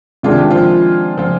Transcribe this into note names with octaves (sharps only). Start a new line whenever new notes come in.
C3 D#3 G#3 D4 F4 G#4
G4
F3 F4
F3 F4